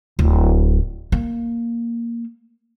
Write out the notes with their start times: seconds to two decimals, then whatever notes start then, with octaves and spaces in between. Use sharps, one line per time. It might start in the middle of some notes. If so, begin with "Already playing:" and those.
0.19 D1
1.12 A#3